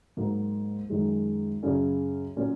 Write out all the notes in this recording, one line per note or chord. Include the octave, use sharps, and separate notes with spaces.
G#2 F#3 A#3
F#2 D#3 G#3
F#2 C#3 F#3 C#4
A#2 F#3 C#4